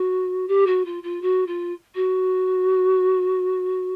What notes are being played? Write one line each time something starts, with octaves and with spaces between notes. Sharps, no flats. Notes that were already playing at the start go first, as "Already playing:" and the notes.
Already playing: F#4
G4
F#4
F4
F4
F#4
F4
F#4